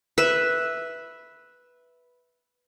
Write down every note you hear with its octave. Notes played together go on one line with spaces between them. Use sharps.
B4 E5